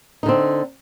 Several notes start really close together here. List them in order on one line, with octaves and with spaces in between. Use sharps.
D#4 D3 C4